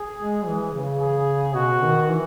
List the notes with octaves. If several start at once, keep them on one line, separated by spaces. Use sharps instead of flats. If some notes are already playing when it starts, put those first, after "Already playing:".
Already playing: G#4
G#3
E3
C#3
G#4
B2 F#4
D#3
E3